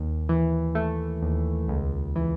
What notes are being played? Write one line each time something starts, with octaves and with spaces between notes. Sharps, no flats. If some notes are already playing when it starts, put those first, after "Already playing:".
Already playing: D#2
E3
A3
D#2
C#2
E3